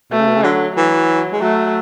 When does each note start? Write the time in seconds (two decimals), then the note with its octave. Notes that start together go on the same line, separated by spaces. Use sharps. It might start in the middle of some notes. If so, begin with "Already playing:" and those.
0.11 B2 A3
0.19 C#3
0.27 B2
0.36 C#3
0.44 D3 F#3
0.76 E3 F#3
1.32 G#3
1.41 F#3 A3